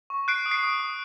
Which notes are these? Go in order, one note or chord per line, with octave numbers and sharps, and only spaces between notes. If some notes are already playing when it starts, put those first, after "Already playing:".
C#6
F#6 C7 D7
D#6
C7 D7
D#6
D#6